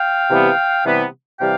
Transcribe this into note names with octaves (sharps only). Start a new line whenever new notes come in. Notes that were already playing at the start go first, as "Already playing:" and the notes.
Already playing: F5 G5
C3 E3 G3 B3
C3 E3 G3 B3
C3 E3 G3 F5 G5